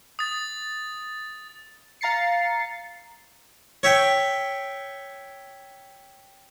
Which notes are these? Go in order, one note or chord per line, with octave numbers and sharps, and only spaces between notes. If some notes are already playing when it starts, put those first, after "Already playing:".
D#6 A6
F5 A#5 A6 C7 C#7
C#5 E5 G5